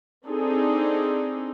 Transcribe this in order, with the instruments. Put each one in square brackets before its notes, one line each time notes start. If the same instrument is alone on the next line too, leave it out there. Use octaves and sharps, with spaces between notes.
[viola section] C4 D4 D#4 G#4 A4